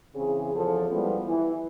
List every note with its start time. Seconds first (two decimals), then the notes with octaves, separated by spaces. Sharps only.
0.16 C#3 E3 C4 G#4
0.55 E2 F3 C#4 A4
0.90 F3 G3 G#3 B3 E4
1.27 E3